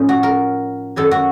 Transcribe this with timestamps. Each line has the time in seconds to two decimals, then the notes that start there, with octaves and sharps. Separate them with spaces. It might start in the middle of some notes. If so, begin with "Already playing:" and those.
Already playing: A2 F3 C#4 D#4
0.09 F#4
0.23 A#4
0.96 F#2 D#3 F#3 A4
1.11 F#4